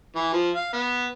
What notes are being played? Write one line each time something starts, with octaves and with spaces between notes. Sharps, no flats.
E3
F3
F5
B3